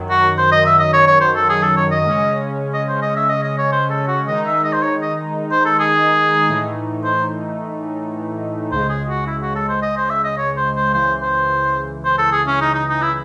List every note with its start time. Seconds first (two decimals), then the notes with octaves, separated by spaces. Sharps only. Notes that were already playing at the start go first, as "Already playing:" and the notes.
Already playing: F#2 D#3 F#3
0.10 F#4
0.38 C5
0.52 D#5
0.66 E5
0.79 D#5
0.93 C#5
1.07 C#5
1.21 C5
1.36 A4
1.49 G#4
1.63 A4
1.76 C#5
1.91 D#5
2.05 C#3 G#3 C#4
2.74 D#5
2.88 C5
3.02 D#5
3.17 E5
3.29 D#5
3.44 D#5
3.58 C#5
3.72 C5
3.90 A4
4.08 F#4
4.27 D#3 G#3 D#4 D#5
4.46 E5
4.64 D#5
4.73 C5
4.83 C#5
5.02 D#5
5.52 C5
5.65 A4
5.79 G#4
6.49 A2 E3 A3 D#4
7.05 C5
8.72 C#2 C#3 G#3 C5
8.89 G#4
9.09 F#4
9.27 E4
9.42 F#4
9.56 A4
9.69 C5
9.82 D#5
9.97 C5
10.10 E5
10.24 D#5
10.38 C#5
10.57 C5
10.76 C5
10.94 C#2 C#3 E3 C5
11.22 C5
12.05 C5
12.18 A4
12.32 G#4
12.47 C#4
12.61 D#4
12.74 D#4
12.89 D#4
13.02 E4